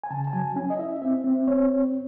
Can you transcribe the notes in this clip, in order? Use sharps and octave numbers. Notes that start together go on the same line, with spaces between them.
G#5
C#3 A5
A5
F#3 G#5
C#4 G#5
D#5
E4 E5
C4 E5
C4
C4 C#5